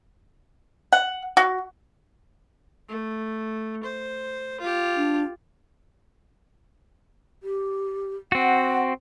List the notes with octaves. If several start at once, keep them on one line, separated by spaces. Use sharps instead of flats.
F#5
F#4
A3
C5
F4 G4
D4
G4
C4 F#4 F#5